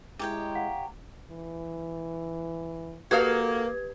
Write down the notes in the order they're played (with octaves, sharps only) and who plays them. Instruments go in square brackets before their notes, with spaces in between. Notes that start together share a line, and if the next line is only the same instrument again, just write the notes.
[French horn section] G#3 E4 [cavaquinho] G4 C#5 G5 [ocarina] A#5
[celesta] F5 F#5 B6
[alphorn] E3
[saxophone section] A#3 [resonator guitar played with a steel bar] F#4 A4 F5 [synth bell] G4 B4 G#6